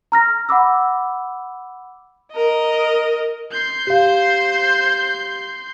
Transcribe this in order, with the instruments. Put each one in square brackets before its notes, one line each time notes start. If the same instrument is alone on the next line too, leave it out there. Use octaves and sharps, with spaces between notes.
[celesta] A#5 F6 A#6
F#5 B5 D6 E6
[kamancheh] A#4 D#5
[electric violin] C6 G6
[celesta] G4 F5 [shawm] C5